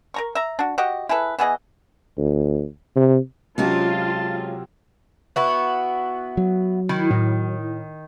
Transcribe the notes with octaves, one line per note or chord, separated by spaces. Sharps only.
A#4 A#5 C#6
E5 A#5
D4 F#4
F#4 G4 D#5
E4 G#4 A4 B4
E3 B3 G#4 D#5
D2
C3
C3 F#3 G#3 C4 C#4 F4 G4 A5
B3 E4 F#4
F#3
D#3 E4
A2